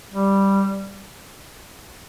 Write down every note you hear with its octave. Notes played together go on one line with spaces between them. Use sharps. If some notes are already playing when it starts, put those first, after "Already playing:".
G3